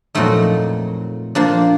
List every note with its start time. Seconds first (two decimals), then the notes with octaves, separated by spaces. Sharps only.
0.15 F2 A#2 F#3 G#3 A3 D#4
1.35 F3 A#3 D4